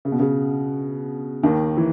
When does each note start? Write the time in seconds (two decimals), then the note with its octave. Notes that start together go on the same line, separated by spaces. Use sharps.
0.05 C#3
0.12 B2
0.19 C#3
1.43 D#2 D#3
1.77 E3